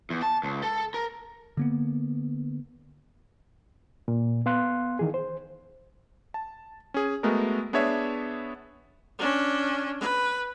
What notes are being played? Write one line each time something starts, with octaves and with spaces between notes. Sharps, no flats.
E2
A5
C#2
A4
A#4
D3 A#3 B3
A#2
B3 F5 C6 F#6
D#3 E3 G#4
C5
A5
C#4 G#4
G#3 A3 B3 F#4 A#4
B3 D4 G#4 C#5 E5
C#4 D4
B4